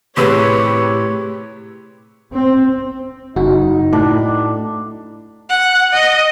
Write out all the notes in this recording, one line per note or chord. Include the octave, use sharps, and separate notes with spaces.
A2 C3 G4 G#4 B4 C#5 C6 E6
C4
F#1 D#4 F#4
A2 D4
F#5
D#5